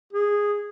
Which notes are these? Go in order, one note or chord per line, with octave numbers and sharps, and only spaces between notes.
G#4